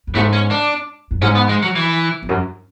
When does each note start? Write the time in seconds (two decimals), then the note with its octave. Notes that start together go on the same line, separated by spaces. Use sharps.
0.07 F#2
0.15 G#2 A3
0.33 C#4
0.51 D4
1.11 F#2
1.21 G#2 C#4
1.35 B3
1.49 G#3
1.63 F#3
1.75 E3
2.23 E2
2.29 F#2